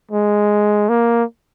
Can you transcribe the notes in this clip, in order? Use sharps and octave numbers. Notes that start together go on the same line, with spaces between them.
G#3
A#3